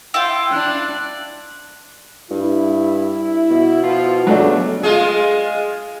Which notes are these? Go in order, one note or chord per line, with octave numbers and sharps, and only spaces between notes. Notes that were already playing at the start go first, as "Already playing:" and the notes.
E4 F4 G5
D4 F#6
G2 E4
B2
F3 B3 F4
F2 C#3 F#3 A3 D4
G#3 F4 G#4